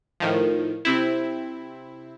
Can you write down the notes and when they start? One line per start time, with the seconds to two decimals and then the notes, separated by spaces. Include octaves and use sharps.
0.20 A2 D#3 F3
0.85 C3 C4 E4